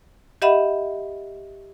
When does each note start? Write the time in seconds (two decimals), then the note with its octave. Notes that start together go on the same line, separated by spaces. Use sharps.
0.42 G4 D#5 E5 F#5 B5